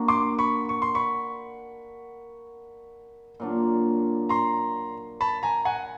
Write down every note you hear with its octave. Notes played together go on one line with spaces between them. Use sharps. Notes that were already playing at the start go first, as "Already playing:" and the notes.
Already playing: A#3 D4 F#4
C6 D6
B5 C#6
C#6
C6
B5 C#6
A#2 F#3 A#3 D4
A#5 C6
A5 B5
G#5 A#5
F#5 G#5